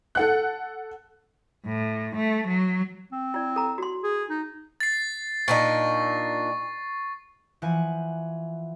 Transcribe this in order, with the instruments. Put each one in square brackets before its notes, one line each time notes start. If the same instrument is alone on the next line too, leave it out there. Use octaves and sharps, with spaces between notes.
[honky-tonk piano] A4 F#5 F#6
[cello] A2
A3
F#3
[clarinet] C4
[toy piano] E4 D5
A4 A#5
F#4 C6
[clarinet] G#4
D#4
[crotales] A6 C7
[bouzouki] A#2 D4 D#4 [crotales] C#6
[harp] E3 F3 F#5 G#5